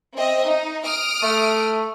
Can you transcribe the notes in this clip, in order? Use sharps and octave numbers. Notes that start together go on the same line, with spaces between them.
C4 D#5 E5
D#4
D#6 F6 D7
A3